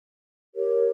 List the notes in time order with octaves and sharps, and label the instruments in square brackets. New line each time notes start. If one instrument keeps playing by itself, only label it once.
[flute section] G4 A#4 C#5